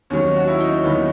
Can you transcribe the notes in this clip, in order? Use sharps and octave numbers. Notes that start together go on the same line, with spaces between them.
D#2 D#3 F#3 C#4
F#4
E4
D#4
C#4
D#2 D#3 F#3 B3